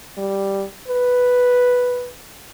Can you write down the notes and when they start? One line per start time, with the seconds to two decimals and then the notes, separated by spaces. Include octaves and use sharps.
0.18 G3
0.88 B4